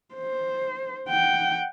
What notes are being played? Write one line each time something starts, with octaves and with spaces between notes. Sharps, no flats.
C5
F#5 G5